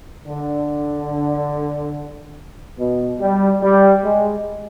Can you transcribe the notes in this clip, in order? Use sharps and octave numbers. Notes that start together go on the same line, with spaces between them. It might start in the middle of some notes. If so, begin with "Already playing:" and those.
D3
B2
G3
G3
G#3